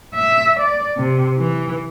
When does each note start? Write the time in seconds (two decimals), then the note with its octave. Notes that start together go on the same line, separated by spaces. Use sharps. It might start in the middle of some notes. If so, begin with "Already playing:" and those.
0.14 E5
0.60 D5
0.98 C3
1.39 E3